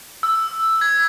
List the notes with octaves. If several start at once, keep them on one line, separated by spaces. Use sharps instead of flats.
E6
G#6